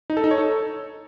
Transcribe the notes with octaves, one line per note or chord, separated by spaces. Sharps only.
D#4
A4
D#4
C#5
A4